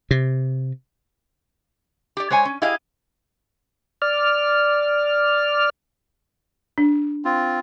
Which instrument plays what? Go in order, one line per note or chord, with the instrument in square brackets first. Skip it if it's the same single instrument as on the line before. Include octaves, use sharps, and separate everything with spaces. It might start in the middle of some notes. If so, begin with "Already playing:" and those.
[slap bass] C3
[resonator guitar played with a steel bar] G4 D5
G#3 C5 C#5 G#5
C#4
E4 G4 G#4 D#5 F5
[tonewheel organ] D5 F6
[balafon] D4
[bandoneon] C4 F4